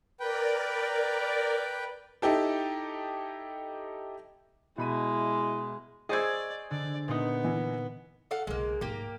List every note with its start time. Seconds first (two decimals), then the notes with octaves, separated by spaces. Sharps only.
0.20 A#4 B4 D5 G5
2.22 D#4 E4 G4 A4
4.78 B2 G#3 E4 B5 D#7
6.09 G#4 C5 D5 D#5 C#6 E6 G#6
6.71 D3 D5
7.08 A#2 B3 D#4
7.44 E3
8.31 A4 F5 F#5
8.47 B1 C#3 G#3 A#3
8.81 D1 G#2 A#3 G4